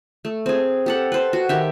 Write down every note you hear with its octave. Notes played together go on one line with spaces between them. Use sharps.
A3
C4 G#4
G4 A4 F#5
B4 C5
F#4
D#3 G4 E5